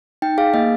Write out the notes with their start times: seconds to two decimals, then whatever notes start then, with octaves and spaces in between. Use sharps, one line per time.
0.22 D#4 G5
0.38 G#4 F5
0.54 A#3 D#5